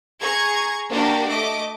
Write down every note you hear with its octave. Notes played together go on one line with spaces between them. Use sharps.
G#4 A#5 C#6 G#6
A#3 D4 F#4 G4 A#4
A3 D#5 D6